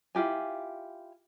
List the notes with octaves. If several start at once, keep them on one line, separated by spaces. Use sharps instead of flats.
E4 F4 G4 G#5